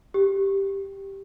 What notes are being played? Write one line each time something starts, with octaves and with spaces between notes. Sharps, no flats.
G4